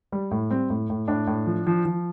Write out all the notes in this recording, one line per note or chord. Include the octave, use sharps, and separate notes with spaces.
G3
A2
G3 C4
A2
A2
A2 D4
A2
F3
F3
F3